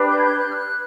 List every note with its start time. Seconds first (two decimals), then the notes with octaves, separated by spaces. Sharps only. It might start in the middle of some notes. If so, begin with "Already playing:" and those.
Already playing: D4 G4 B4
0.08 G6
0.18 G#6
0.23 G6
0.39 F#6
0.51 F6
0.55 F#6